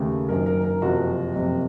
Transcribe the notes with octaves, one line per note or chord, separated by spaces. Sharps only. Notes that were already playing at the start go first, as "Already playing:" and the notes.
Already playing: D#2 C#3 A3
F#1 F#2 D#3 A#4
A#4
A#4
F#1 F2 C3 F3 F#4
F#1 F2 C3